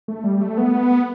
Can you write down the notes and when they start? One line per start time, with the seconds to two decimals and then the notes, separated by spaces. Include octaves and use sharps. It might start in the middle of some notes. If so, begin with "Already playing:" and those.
0.08 A3
0.24 G3
0.41 A3
0.58 B3